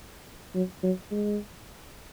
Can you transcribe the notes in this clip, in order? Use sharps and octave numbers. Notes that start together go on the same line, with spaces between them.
F#3
F#3
G#3